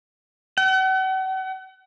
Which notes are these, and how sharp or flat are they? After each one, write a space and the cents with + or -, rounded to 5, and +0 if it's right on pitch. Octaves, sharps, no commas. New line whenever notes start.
F#5 +40